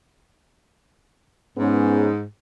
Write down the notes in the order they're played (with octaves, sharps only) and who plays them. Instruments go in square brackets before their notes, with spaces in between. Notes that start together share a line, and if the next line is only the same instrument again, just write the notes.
[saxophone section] G#2 [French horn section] B3 C#4 G#4